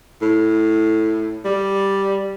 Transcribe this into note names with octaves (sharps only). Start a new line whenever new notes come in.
A2
G3